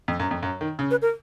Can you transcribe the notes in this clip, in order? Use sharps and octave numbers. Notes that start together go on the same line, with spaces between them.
F2
F#2
F2
F#2
D#3
C#3
B4
A#4